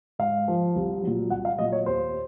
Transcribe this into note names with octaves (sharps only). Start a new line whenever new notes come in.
G#2 F5
F3
C2
A#2 F#3
C2 F#5
F5
A#2 F#3 D#5
C#5
D#2 C5